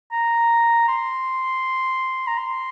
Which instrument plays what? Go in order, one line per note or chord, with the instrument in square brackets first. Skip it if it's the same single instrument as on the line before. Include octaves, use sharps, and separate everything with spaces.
[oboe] A#5
C6
A#5
C6